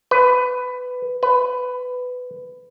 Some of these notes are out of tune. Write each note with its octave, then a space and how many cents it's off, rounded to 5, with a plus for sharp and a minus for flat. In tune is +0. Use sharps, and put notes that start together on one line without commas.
B4 +15
B4 +15